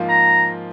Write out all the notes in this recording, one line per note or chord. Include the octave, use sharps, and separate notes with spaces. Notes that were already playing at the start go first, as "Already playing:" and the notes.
Already playing: G#2 F3 A#3 F4
A#5